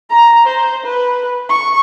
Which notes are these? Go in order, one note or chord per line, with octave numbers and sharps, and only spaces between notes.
A#5
C5
B4
C#6